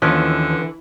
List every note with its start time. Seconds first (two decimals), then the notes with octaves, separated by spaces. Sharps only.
0.02 D#2 D3 E3 F3 C#4